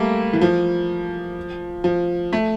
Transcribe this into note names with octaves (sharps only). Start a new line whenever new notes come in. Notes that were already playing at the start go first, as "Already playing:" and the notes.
Already playing: G3 A3 A#3
E3
F3
F3
A3